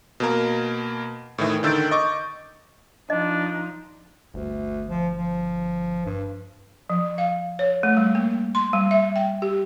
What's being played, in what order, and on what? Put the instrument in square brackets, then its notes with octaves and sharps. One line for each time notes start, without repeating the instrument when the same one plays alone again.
[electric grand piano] B2 A#3 A#4
A2 D#3 E3
D3 D#3 E6 G6 A6 D7
D#5 C#6 D6
[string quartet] F3 D#4 [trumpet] D4 [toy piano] D#5
[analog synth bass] G1 [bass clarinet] D2
[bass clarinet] F3
F3
G2
[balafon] F3
F5
C#5
A3
G3
A#3
C6
G3
E5
G5
G4